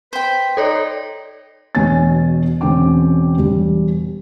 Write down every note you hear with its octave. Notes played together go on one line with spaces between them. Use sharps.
B4 C5 G5
D#4 A4 C#5 D5
E1 B2 F#4 C#5 G#5 A6
E1 C4 C#4 G5 D6
E1 G3